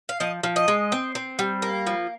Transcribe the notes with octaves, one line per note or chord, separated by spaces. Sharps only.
F5
F3 D#5
F3
D#5
G#3
C4
C4
G3
A#3
F3